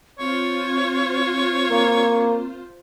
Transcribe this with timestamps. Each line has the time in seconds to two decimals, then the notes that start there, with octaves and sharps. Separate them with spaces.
0.19 C4 F4 C5 C#5
1.70 A#3